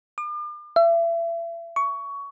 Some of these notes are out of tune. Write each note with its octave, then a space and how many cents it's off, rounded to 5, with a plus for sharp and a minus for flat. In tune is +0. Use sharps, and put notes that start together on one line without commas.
D6 +40
E5 +35
C#6 +20